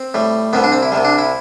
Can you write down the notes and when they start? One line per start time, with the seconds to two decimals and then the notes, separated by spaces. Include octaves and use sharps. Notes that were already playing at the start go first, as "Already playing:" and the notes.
Already playing: C4
0.14 A2 G3
0.53 C2 C3 G3 B3
0.64 D4
0.72 C4
0.82 E4
0.92 C2 C3 G3
1.04 D4
1.18 E4